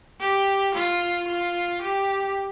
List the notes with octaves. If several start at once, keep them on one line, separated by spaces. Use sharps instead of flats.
G4
F4
F4
G4